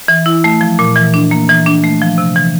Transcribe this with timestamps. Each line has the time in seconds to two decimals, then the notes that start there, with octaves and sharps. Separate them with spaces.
0.08 E3
0.26 E4
0.44 A3
0.61 F3
0.79 A#2
0.96 E3
1.14 D4
1.31 A#3
1.49 E3
1.66 D4
1.84 A3
2.01 F3
2.18 C3
2.36 E3